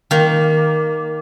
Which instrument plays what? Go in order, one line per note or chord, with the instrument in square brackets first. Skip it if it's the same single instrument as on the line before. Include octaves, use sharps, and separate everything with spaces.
[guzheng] D#3 A#3